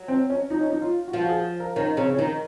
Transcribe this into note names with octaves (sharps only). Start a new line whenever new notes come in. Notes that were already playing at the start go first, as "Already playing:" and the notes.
Already playing: F#3
C4
C#4
D#4
C#4
D#4
F4
F#4
F3 F4
F#4
G#4
A#4
D#3 C#4
C#3 C4
C#4
D#3 D#4